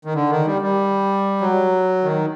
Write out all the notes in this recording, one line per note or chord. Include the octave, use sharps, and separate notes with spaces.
D#3
D3
D#3
G3
G3
F#3
D#3